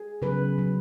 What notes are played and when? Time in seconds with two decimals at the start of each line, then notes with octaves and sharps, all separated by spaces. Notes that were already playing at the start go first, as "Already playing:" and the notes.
Already playing: G#4
0.22 C#3 F#3 B4
0.58 C#3 F#3